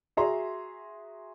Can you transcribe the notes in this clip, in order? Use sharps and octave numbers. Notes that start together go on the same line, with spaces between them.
F#4 G#4 E5 A#5 C6